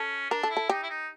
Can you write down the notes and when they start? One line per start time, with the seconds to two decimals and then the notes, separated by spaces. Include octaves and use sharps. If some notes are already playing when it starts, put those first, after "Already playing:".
Already playing: C#4 A4
0.31 D4 A#4
0.43 A4
0.50 E4
0.57 A4
0.69 D#4 G4
0.83 E4
0.90 D#4